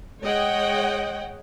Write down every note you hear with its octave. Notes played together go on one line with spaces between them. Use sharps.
G#3 C#5 D#5 F#5 G5